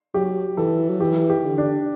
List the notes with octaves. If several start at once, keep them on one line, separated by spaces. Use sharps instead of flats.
F#3 G4
E3 A4
F#3
E3 G4
G4
D3
D4